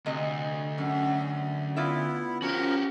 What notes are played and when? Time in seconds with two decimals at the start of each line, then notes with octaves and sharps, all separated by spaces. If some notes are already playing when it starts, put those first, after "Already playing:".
0.06 D2 C3 D#5
0.78 F#2
1.76 B3 E4 F4 D5 E5
2.42 F3 C#4 F#4 G4 A#4